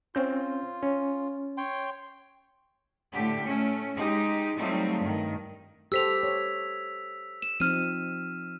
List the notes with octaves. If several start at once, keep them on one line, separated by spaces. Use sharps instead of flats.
C4 C#4 F4 G6
C#4
C#5 G5 C6
A2 D3 A3 G4
A3 C#4
G#3 D#4 G4
F#3 G3 A3 C4 D#4 F4
G2 D#3
G4 A4 C5 E6 B6 F7
C#5
E7
F3 C4 D#4 F6 D#7